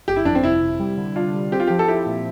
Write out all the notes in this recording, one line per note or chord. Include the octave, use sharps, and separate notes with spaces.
G1 G4
E4
F2 D4
C4
C3 E4
C3
G3
D3
D4 F4
G3
C4 G4
F4
F3 G4
A4
E4 G4
A#2